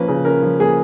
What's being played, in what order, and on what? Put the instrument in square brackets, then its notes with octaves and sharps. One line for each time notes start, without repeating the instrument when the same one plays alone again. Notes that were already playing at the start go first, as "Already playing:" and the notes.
Already playing: [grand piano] F3 A#3 C#4 A#4 B4
C#3
C#4 A#4
F3
A#3 G#4